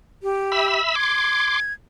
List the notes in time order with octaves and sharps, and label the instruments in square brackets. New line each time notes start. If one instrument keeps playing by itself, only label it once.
[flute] G4
[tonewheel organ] E5 B5 E6
[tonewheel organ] C6 D6 [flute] G#6